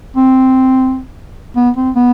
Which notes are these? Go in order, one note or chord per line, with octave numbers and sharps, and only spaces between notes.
C4
B3
C4
B3